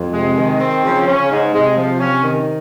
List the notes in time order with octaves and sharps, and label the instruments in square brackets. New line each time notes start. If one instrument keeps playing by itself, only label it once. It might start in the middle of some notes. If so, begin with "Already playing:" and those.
Already playing: [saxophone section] F2
[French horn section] C3 [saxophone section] G#3
[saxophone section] D#3
C4
[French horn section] C#3 [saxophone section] F3
[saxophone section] C#4
[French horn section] C#3
[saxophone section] G#2
[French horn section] C3 [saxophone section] G#3
[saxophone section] F3
C#4
D#3